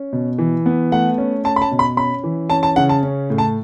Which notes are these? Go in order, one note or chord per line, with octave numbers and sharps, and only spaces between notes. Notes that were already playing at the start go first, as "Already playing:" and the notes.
Already playing: C#4
B2
E3
B3
A3 F#5
C#4
C#4 A5
B5
A5
B2
B5
C#4 B5
E3
C#4 A5
A5
C#3 F#5
A5
C#4
A2
A5